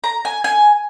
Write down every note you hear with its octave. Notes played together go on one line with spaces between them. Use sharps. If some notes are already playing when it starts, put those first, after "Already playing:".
A#5
G#5
G#5